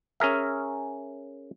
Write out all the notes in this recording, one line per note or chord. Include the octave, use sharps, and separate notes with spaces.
C#4 G#4 A#4 E5